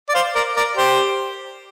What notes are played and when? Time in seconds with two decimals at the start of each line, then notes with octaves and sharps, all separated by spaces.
0.09 D5
0.14 C5 F5
0.35 A#4 D5
0.56 A#4 D5
0.77 G4 C5